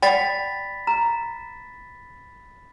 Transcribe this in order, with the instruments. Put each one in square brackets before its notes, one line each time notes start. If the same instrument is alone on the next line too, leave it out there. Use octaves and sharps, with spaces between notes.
[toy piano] D5 F#5 G5 [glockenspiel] B5 A6 B6
[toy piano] A#5